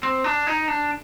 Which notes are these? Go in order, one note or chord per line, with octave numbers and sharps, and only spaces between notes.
C4
D4
D#4
D4